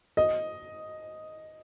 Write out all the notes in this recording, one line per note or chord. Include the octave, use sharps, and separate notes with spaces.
D#5